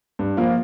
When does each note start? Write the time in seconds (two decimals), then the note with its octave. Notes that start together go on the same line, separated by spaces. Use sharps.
0.19 G2
0.37 F3 A#3 F4